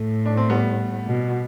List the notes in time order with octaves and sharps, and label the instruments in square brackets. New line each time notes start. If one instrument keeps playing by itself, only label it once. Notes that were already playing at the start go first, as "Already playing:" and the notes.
Already playing: [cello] A2 [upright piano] A3
[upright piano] D4
C4
G3 B3
[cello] B2